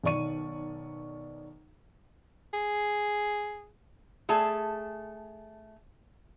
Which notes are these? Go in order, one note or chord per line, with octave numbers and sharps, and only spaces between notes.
B1 D#3 D5 C#6 D#7
G#4
A3 G#4 G#5 A5